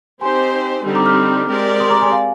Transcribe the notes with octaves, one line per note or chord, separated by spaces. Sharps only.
C4 D#4 G4 C5 G#5 C6
D3 G3 C4 D#4 G4
A#5 D6
D6 F6
G#3 C4 G4 A#4 D5
C6 D#6
A#5 D6
G#5 C6
F5 G#5